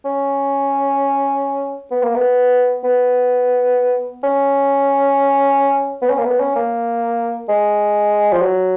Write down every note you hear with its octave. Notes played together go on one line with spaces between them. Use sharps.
C#4
B3
A#3
B3
B3
C#4
B3
C#4
A#3
B3
C#4
A#3
G#3
F3
F#3